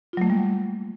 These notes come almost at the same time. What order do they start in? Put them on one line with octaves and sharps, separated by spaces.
F4 F#3 A3 A#3 G3